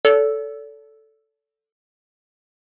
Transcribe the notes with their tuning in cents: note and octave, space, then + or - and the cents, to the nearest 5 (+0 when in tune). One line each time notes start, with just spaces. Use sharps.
A4 +0 D5 -45